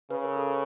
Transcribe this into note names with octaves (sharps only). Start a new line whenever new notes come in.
C#3 B4
A#4
A4